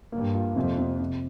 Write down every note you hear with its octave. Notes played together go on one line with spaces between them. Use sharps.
G2 A#3
F4
F2 C3
C3
C3